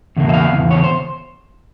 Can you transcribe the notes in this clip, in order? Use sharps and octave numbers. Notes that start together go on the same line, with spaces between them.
E2 C#3 A#3
E5
F5
E2 C#3
C#5
C5